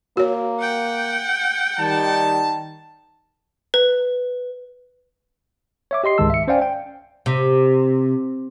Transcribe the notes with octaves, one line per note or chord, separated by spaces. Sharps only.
A#3 F#4 C#5
F#5 G5
D#3 G3 A5
B4
C#5 E5 D6
G4 D#5 C6 C7
C#2 G#2 D#3 G#3 A5 E6
E5 C#7
C#4 C5 D5 F5 G5 G#5
G5
C3